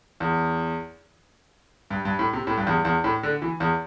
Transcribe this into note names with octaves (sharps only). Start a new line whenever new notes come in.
E2
G2
G2
A2
C3
A2
G2
E2
E2
A2
D3
E3
E2